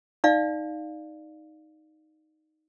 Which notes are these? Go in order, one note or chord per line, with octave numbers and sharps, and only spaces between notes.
D#4 D5 F5